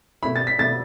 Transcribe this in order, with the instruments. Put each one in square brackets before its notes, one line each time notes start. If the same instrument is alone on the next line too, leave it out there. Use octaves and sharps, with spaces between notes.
[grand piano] B2 A3 E4 [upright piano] B5
[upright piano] A6
B6
[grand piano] B2 A3 E4 [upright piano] A6